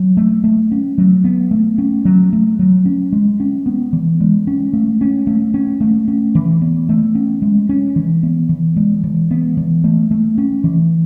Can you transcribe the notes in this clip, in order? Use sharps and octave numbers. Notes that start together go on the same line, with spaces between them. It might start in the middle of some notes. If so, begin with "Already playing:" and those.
Already playing: F#3
A3
A3
C#4
F#3
B3
A3
C#4
F#3
A3
F#3
C#4
G#3
C#4
B3
E3
G#3
C#4
A3
C#4
A3
C#4
A3
C#4
E3
B3
A3
C#4
G#3
C#4
E3
B3
E3
G#3
E3
B3
E3
A3
A3
C#4
E3